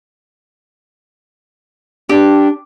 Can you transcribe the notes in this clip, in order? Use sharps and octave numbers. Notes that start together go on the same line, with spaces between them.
D4 G4